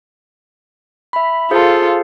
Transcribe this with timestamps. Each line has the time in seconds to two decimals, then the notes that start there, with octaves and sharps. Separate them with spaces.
1.13 E5 B5
1.51 F4 G#4 A4 C5 F5